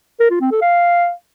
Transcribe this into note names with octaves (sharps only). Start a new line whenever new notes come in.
A#4
F4
C4
A4
F5